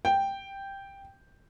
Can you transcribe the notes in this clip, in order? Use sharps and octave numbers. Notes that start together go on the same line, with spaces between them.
G5